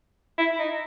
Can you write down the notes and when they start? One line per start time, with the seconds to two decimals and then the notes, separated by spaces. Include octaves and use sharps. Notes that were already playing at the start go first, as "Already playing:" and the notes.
0.38 E4
0.59 D#4